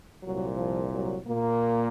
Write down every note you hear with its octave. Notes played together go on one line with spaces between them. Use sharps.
C2 A#2 F#3
F3
F#3
A#2 A#3